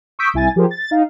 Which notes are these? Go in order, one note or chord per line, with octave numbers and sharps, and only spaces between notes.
C#6 D#6 E6 G6 B6 D7
C2 E4 G#5 A6
F3 G4 G#4 A#4 C5
A6
D#4 F5